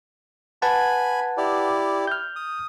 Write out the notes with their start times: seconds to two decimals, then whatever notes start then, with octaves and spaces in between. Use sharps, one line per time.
0.62 B4 F#5 G#5 A5 B5
1.37 E4 G4 D5
2.07 F6 G6
2.36 D#6